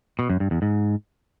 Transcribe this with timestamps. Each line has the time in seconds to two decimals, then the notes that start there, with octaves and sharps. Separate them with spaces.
0.19 B2
0.30 F#2
0.40 G2
0.51 E2
0.62 G#2